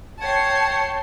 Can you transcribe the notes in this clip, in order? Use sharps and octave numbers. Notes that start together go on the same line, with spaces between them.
C#5 F#5 G5 A5 G#6 C7